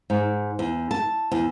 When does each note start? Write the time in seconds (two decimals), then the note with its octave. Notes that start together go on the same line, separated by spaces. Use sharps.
0.10 G#2
0.59 E2
0.91 A5
1.32 E2